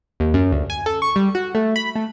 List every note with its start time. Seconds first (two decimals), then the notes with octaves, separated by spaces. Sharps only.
0.20 D#2
0.34 F#2
0.52 D2
0.70 G#5
0.86 A4
1.02 C#6
1.16 G3
1.35 F#4
1.55 A3
1.76 B5
1.95 A3